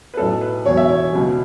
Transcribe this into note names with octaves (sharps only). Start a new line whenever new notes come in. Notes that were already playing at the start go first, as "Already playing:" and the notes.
B4
B1 A2 F#3 C#4 A4
B4
E1 E2 B2 F#3 C#5
E5
C#5
C#2 B2 F#3